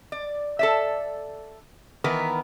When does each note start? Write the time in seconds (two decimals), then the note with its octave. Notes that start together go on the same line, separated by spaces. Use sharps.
0.12 D5
0.59 A4 D5 E5
2.04 D#3 E3 B3 A#4 B4